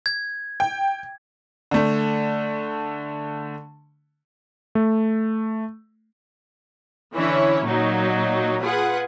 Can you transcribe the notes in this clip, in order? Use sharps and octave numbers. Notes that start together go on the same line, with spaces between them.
G#6
G5
D3 A3
A3
D3 E3 C#4 E4 C#5
A#2 F#3 D#4
F4 G#4 B4 F#5